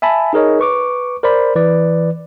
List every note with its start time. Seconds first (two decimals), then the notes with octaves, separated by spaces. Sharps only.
0.02 E5 G#5 A5 B5
0.33 D#4 G#4 A#4 C#5 D#5
0.59 B4 C#6 D6
1.23 A#4 C5 D5 B5
1.56 E3 B4 D5